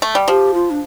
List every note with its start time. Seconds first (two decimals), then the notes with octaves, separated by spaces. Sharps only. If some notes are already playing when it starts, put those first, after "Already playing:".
0.02 A3
0.15 G3
0.28 F3 G4
0.54 F4
0.71 D4